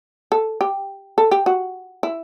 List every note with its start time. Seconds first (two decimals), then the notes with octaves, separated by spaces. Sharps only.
0.32 A4
0.61 G4
1.18 A4
1.31 G4
1.46 F#4
2.03 E4